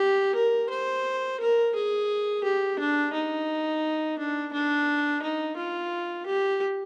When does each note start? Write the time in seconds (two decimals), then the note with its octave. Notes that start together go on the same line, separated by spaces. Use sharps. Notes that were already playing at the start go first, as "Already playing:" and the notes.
Already playing: G4
0.35 A#4
0.70 C5
1.41 A#4
1.75 G#4
2.44 G4
2.79 D4
3.13 D#4
4.19 D4
4.53 D4
5.22 D#4
5.57 F4
6.26 G4